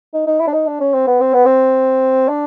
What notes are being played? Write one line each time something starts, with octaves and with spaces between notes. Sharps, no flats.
D#4
D#4
E4
D4
D#4
D4
C#4
C4
B3
C4
B3
C4
D4